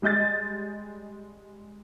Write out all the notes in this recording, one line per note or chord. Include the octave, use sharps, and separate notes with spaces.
G3 G#3 D#5 G6 A6